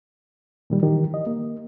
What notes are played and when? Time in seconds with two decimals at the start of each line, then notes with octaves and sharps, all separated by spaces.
0.70 A#2 D#3 G3
0.83 D#3 E3 G4
1.14 D#5
1.27 A#3